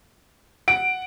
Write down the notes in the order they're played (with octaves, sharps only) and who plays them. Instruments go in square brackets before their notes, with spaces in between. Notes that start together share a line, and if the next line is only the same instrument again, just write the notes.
[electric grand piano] F#5 [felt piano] D7